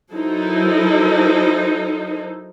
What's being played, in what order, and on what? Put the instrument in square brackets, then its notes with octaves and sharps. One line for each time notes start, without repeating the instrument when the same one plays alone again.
[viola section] F#3 D#4 E4 A4 A#4 C5